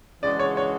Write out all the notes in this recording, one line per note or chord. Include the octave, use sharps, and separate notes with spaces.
C#3 E3 G#3 D4 F#4 D5
C#5
C#5